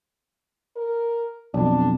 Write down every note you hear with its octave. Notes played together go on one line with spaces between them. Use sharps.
A#4
B1 F2 D4